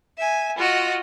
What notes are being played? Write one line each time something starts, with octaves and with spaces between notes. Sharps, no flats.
E5 G#5
F4 F#4 D#5